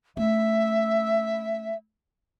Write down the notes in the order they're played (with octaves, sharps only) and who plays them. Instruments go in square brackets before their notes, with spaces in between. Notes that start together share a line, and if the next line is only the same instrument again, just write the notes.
[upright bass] A3 C#4 [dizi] E5